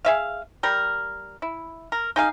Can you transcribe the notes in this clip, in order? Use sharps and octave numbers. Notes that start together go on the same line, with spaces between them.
G#4 E5 F5
G3 A#4
E4
A#4
D#4 G#4 F5